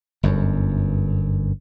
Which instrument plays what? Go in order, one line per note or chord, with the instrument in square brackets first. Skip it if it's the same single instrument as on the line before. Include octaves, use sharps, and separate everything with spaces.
[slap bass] G1 F#2